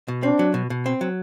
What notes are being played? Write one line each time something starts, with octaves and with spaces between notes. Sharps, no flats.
B2
C4 D4
F#3
B2
B2
C4
F#3